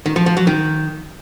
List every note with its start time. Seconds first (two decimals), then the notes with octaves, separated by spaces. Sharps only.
0.06 D#3
0.16 F3
0.26 F3
0.37 F#3
0.47 D#3